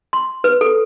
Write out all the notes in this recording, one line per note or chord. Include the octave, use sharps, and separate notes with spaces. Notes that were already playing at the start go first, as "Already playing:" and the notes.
C6
B4
A4